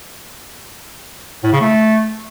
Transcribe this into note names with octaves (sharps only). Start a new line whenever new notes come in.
A2
C#3
A3